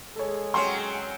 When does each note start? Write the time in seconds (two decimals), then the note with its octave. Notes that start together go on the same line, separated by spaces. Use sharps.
0.16 G#3 G#4 A4 C#5
0.54 F#3 C4 C#4 C6